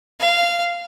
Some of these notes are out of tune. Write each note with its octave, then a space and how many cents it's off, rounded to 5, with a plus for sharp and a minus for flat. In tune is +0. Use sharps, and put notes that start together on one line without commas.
F5 -15